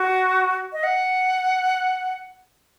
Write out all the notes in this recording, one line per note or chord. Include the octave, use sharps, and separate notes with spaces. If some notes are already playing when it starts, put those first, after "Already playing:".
Already playing: F#4
D#5
F#5